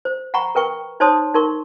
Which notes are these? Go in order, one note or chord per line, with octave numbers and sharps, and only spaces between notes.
C5
F#5 G5 A#5 B5 C#6
A#4 B4 G5 C#6
D#4 C5 C#5 A5 C6 D#6
D#4 A#4 C6 C#6